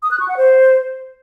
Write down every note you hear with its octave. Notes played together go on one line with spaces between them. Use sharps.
D#6
F#6
C#6
F#5
C5